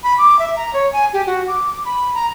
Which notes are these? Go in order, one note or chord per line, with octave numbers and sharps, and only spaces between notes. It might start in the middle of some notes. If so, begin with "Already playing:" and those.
B5
D6
E5
A#5
C#5
G#5
G4
F#4
D6
B5
A#5